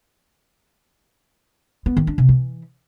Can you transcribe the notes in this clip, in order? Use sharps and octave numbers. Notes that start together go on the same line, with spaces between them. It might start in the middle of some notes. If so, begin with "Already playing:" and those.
B3
D#3
D4
C3
E3